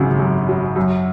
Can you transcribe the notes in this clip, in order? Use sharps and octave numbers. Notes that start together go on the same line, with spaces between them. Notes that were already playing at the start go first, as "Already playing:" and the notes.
Already playing: G#1 F#2 C#3 F#3
F#2
F#3
F#2